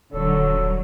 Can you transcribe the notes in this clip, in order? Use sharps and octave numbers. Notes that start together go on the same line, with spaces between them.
D#1 D3 F#3 A4 C#5